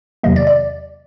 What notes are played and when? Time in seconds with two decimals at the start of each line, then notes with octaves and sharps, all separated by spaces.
0.23 E2 C3 D#3 F#3 A#3 D#5
0.36 D5
0.47 D5